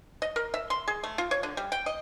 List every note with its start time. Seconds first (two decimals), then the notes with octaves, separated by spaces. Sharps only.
0.22 D#5
0.36 A#4
0.54 E5
0.70 C6
0.88 G#4
1.03 A3
1.18 F4
1.31 C#5
1.43 D3
1.57 G3
1.72 G5
1.86 D#5